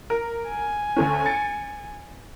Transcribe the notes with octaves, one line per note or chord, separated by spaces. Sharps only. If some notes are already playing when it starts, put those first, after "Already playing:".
A#4
G#5
D2 A3 C#4
A6 C#7